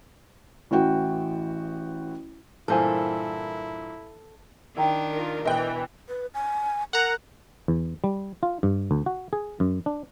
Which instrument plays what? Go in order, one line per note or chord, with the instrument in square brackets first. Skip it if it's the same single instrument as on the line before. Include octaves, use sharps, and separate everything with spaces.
[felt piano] A1 E3 F#4 G5
[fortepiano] G2 A#2 E3 [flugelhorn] E4 [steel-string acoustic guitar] A4 [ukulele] A#4 C5 G#5
[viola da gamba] D#3 D4 [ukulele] E4 G5 A#5
[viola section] F4 A#4
[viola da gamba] B2 [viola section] E3 [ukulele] B4 C5 [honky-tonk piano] D#5 G5 F#6
[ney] B4
G#5
[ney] A#4 [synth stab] F#5 A#5
[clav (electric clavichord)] E2
G3
F4
G2
D2
F#4
G#4
F#2
D4